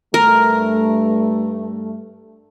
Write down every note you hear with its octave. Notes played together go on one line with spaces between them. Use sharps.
G2 A3 A#4